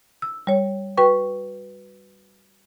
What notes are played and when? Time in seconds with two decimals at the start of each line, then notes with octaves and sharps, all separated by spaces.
0.22 E6
0.47 G3 C#5
0.97 F#4 B4 G5 C#6